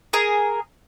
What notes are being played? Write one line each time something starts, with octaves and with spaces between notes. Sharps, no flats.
G#4 A#4